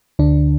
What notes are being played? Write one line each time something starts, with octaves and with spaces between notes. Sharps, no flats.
D2 D3 D4